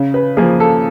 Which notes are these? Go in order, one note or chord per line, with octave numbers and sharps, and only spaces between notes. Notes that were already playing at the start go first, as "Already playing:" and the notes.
Already playing: C#3
B4
F3 A#3 G#4
A4